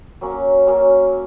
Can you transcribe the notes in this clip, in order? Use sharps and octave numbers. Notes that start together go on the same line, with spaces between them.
F#3 A#3 C#4
F#3 A#3 C#4